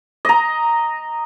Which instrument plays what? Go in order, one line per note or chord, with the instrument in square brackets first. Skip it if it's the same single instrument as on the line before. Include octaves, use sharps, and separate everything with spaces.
[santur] D#5 A#5